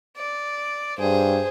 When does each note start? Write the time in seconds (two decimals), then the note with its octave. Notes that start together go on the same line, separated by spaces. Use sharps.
0.17 D5
0.99 G2 G#4 C5